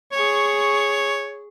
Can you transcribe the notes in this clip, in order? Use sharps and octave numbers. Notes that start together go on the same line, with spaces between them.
G#4 C#5 C#6